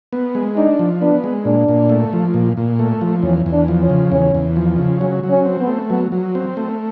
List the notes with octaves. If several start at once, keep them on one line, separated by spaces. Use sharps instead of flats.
B3
G#3
D4 D#4
F3
B3 D4
G#3
A#2 D4
A#2
A3
F3
A#2
A#2
A3
F3
E2 C#4
E2
D4
F3
C#4
C#3
E2 C#4
E2
F3
C#3
F#3 C#4
F#3
C#4
C4
B3
A3
F#3 B3
F#3
C4
A3